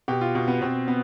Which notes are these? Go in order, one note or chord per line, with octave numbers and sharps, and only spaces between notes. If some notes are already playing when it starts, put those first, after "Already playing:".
B2 G4
F4
B2
B3
B2 C4
B3